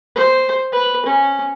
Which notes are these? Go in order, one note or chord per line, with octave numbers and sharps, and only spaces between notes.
C5
B4
C#4